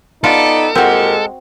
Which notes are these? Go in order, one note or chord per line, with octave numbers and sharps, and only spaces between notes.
B3 D#4 F4 A4 D5
A#2 G#3 C4 F#4 G4 A#4